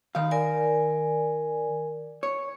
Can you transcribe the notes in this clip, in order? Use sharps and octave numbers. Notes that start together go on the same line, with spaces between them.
D#3 F5
A#4 D5 G#5
C#5